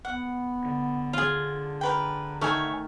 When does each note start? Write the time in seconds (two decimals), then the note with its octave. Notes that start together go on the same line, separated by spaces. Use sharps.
0.05 B3 F#5
0.65 D3
1.13 F4 G#4
1.51 D4
1.81 A#4 B4 G5
2.41 D#3 A3 C#5 E5 G#5